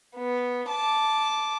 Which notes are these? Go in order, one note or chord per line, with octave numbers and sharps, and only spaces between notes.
B3
A5 D6